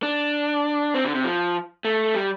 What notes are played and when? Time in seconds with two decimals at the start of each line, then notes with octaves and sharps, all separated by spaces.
0.03 D4
0.94 C4
1.05 D3
1.15 C3
1.24 F3
1.85 A3
2.15 G3